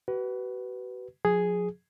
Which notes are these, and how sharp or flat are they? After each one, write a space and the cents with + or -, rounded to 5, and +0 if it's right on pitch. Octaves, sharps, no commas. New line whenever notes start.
F#4 +40 B4 +0
F3 +45 G#4 +0